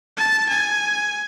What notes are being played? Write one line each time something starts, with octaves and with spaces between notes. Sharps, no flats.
A5
G#5